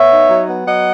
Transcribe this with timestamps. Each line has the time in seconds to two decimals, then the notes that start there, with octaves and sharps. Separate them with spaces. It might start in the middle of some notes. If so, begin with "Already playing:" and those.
Already playing: B3 C#5 E5
0.11 D#4
0.29 F#3
0.48 B3
0.66 F#3 D#5 F#5